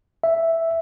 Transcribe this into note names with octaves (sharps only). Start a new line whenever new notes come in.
E5